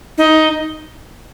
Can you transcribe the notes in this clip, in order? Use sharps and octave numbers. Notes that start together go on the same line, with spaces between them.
D#4